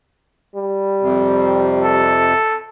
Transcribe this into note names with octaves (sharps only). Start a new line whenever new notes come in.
G3
F2 C3
A4